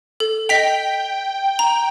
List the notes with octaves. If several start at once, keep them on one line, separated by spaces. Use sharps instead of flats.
A4
D#5 G5 B6 F7
A#5